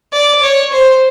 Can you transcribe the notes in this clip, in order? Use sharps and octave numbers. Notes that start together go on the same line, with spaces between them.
D5
C#5
C5